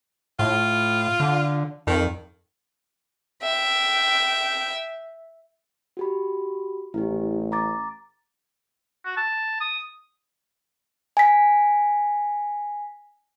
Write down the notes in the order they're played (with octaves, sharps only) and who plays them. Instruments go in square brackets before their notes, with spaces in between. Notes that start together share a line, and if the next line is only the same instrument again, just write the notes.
[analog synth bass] A2 [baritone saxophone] F4
[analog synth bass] D3
[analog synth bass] F2 [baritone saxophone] D#3
[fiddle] E5 G5
[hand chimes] F#4 G4 B5
[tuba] A1 [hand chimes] E4 G4
[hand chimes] A#5 D6 A6
[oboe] F#4
A5
D#6
[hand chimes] G#5 B6